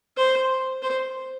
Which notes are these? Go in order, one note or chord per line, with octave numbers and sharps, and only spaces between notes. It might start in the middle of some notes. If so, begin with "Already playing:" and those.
C5
C5